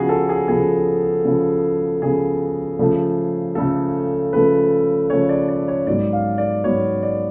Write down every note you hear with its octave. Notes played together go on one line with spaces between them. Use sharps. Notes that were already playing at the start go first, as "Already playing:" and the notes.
Already playing: C#3 F3 B3 F#4 G#4
A4
G#4
C#3 F3 B3 G#4
C#3 F3 B3
C#3 F3 B3 G#4
C#3 F3 A3
C#3 F3 A3 A4
C#3 F3 A3 B4
C#3 F3 A3 C#5
D5
D5
C#5
G#2 F#3 B3 D5
F5
D5
G#2 F#3 B3 C#5
D5